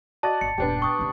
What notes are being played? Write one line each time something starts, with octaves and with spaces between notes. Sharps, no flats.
F#4 D5 D#5 A5 A6
G1 C#7
D#1 F#2 B3 D4 G4
C#6 D#6
F1 C#3